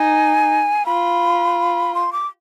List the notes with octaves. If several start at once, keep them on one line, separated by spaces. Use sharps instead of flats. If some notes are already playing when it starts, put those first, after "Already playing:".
Already playing: D#4 G#5
F4 B5
C6
D6